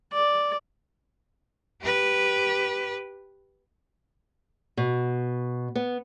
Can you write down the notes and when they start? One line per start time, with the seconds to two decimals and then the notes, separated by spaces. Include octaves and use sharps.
0.13 D5
1.81 G4 B4
4.77 B2
5.75 B3